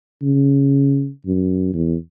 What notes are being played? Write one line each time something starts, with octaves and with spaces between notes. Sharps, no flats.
C#3
F#2
E2